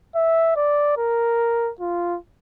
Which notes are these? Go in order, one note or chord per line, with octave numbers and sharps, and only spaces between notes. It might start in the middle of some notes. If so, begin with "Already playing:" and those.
E5
D5
A#4
F4